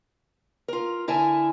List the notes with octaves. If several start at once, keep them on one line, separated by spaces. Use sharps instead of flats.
F4 A#4
D3 E4 A#4 E5 G#5 A5